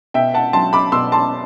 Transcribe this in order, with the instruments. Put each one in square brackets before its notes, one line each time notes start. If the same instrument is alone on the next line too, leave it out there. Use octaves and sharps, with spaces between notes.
[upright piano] B2 E5 G5
F#5 A5
F#3 A5 C6
B5 D6
B2 C6 E6
A5 C6